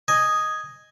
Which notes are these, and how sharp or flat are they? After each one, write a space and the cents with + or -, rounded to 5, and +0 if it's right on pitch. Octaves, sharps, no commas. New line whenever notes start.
D#5 +0 G#5 +0